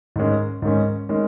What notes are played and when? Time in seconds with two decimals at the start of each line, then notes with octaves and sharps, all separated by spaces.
0.16 G#2 D#3 G#3 C#4
0.62 G#2 D#3 G#3 C#4
1.09 D#3 G#3 C#4